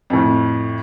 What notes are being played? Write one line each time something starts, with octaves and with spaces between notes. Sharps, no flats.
F2 A2